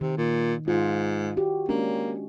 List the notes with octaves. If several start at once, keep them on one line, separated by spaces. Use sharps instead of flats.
C3 D#3
A#2
G#2 F4
F#4 G4
G#3 A#3 C#4 D4